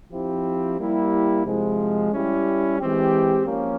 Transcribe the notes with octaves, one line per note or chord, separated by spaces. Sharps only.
F3 C4 E4 G4
G3 A#3 E4 G4
C3 F3 G#3
G3 C#4 E4 G4
E3 G#3 C4 G4
F3 A#3 C#4